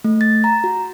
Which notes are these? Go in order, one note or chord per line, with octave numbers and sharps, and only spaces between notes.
A3
A6
A#5
F#4